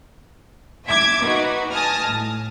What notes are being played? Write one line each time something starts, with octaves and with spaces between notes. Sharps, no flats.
E5 D6 G#6
D#4 F#4 B4
G#5 A5 D#6 F6 A#6
A2